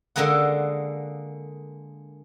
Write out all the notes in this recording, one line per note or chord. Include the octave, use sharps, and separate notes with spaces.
D3 G#3 A#3 G#4 F#5